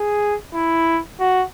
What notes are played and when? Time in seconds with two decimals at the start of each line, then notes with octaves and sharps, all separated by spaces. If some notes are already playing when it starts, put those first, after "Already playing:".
Already playing: G#4
0.54 E4
1.20 F#4